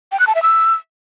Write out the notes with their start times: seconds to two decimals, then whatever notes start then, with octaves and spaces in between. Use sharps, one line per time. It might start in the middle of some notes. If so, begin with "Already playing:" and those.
0.12 G5
0.19 F#6
0.27 A5
0.35 E5
0.42 E6